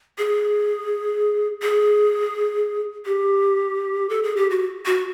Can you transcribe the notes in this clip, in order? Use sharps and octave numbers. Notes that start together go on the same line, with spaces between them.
G#4
G#4
G4
A4
G#4
G4
F#4
F#4